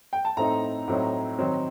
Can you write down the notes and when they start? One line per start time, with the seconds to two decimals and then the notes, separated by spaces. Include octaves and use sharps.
0.13 G5
0.25 A5
0.37 A2 A3 C4 D#4 A#5
0.88 A2 F#3 C4 D#4
1.39 D#3 F#3 C4 D#4